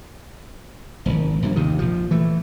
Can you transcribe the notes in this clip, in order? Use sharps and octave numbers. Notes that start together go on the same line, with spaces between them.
D#1 G#1
A#1 G2 A#2
D#2 C3 D#3
A#1 F3
E3 A3